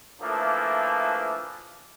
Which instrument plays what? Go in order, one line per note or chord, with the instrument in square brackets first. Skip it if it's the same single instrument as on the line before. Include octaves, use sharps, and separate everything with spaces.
[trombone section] E3 F3 A3 A#3 D4